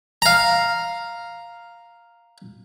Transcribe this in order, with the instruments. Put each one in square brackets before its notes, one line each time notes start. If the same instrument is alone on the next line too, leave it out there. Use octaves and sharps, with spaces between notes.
[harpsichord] F5 A#5